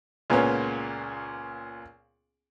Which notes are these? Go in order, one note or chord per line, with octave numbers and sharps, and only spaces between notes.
C#2 A#2 A#3 B3 C#4